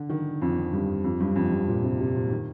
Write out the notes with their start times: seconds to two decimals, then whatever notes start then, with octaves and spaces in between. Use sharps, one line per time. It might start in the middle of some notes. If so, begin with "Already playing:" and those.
Already playing: D3
0.09 D#3
0.42 F2
0.73 G2
1.04 F2
1.20 G2
1.36 F2
1.51 G2
1.68 A#2
1.84 C3
1.99 C3
2.16 A#2
2.31 D#3